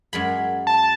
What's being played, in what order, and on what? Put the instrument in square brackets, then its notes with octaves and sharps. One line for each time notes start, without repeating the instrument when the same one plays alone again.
[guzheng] F#2 G#3 B5
[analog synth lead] A5